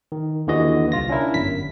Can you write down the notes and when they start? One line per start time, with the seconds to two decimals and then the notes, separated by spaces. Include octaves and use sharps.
0.12 D#3
0.47 D#2 D3 E3 F#4 D#5
0.92 C2 F4 A#6
1.09 C#4 D4 E4 A#4
1.34 G1 F#2 B6